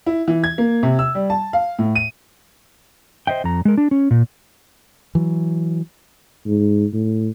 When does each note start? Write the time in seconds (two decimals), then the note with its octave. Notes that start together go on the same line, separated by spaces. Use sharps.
0.06 E4
0.28 E3
0.44 G#6
0.58 A#3
0.83 C3
0.99 E6
1.15 G3
1.30 A5
1.53 F5
1.79 A2
1.95 D#7
3.27 C5 D#5 E5 G5
3.44 F2 A#5
3.65 G#3 A#4
3.77 D4
3.91 C#4
4.11 A#2
5.15 E3 F#3
6.46 G#2
6.93 A2